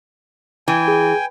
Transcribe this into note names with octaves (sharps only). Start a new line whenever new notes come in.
E3 G5 G#5
G#4